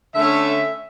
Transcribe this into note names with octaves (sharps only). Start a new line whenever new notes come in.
D3 A3 C#4 E5